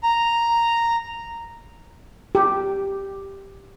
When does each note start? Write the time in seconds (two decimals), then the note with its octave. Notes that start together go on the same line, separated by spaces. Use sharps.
0.03 A#5
2.35 G4